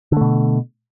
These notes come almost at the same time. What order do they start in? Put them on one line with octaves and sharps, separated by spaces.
D3 A3 B2